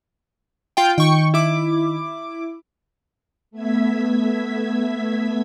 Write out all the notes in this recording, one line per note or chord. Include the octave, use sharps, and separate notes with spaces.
F4 G5
D#3 G5 C#6
E4 D6
A3 B3 E5 G#6 B6